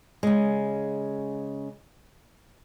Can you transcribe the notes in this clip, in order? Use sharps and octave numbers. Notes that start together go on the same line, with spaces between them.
C#3 G#3